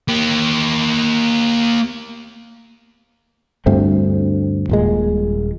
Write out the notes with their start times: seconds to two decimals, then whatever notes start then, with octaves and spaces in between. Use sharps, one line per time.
0.09 A#3 G4
3.66 D2 G2 A3 C4
4.69 D#1 A#2 G#3